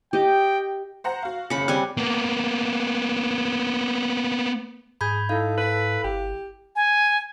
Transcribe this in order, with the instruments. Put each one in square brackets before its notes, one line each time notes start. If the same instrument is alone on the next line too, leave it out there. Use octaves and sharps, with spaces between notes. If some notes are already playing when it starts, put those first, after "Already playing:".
[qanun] G4 D#5 [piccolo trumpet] G5
[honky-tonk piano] C5 F#5 A#5
F#4 F5
[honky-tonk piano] F#1 C#7 [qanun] C#3 B5
[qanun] G3 C4 G#5 [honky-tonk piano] F#6
[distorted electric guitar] A#3 B3
[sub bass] G#2 [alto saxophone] G#4 [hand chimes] B5 G6 G#6
[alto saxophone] D#4 [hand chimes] E4 F5 [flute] A4
[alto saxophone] B4
[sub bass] G1 [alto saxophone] G4
[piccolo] G#5